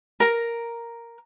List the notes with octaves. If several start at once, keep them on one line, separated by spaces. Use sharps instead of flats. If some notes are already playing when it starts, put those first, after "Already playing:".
A#4 A#5